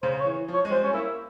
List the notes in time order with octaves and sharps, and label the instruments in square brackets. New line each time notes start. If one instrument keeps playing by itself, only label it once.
[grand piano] C#3 [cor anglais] C5
[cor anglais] C#5
[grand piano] E3
F3
[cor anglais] C#5
[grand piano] G#3
[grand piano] G3 [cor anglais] C5
[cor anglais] C#4
[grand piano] A#3 [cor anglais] E4